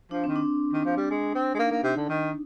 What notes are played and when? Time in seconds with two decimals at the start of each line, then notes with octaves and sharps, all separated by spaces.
0.11 F3 D4
0.24 D#3 C4
0.36 D4
0.73 D#3
0.85 F3
0.97 G3
1.10 G#3
1.35 C4
1.54 G#3
1.59 A#3 D#4
1.71 A#3
1.84 C3
1.96 D3
2.09 D#3